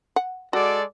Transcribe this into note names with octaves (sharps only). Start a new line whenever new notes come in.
F#5
G#3 F#4 A4 D5